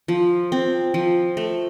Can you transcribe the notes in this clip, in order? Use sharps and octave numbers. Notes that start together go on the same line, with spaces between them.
F3
C4
F3
A3